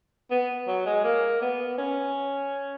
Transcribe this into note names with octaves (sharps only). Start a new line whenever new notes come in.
B3
F#3
G#3
A#3
B3
C#4